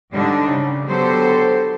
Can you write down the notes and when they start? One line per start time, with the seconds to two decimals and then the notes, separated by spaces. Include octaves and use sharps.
0.13 G#2 D3 G3 D4 D#4
0.49 C#3
0.85 D3 F#3 B3 G4 A4 C5